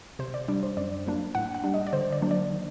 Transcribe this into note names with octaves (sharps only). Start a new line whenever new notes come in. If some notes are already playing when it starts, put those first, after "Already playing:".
C3 C5
D5
G3 D4 D5
C5
F#2 D5
F#3 A#3 D4
A2 F#5
F#5
G3 D4
D#5
D5
D3 C5
D5
F#3 A#3 D4
D5
D#3